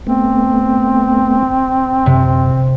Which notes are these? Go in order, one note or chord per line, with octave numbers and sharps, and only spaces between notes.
A3 B3 C4
F#2 C3